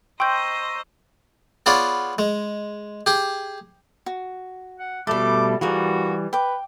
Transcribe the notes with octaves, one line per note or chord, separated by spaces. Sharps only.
C5 D#5 G5 A#5 C6 C#6 E6 G6
B3 F4 G#4 C#5 D5
G#3
G4 G#4
F#4
F#5
B2 G3 A3 A4 D5 D6
E3 G3 F4 F#4 G#4 A#4
B4 G5 D6